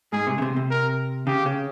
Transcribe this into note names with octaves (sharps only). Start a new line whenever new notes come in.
G#2 G#4
C3
C#3
C3
C3
A#4
C#3 G4
C#3